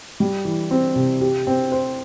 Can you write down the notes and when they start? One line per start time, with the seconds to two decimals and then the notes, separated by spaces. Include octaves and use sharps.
0.20 G3
0.45 E3
0.71 C4
0.96 C3
1.21 G4
1.47 C4
1.72 C5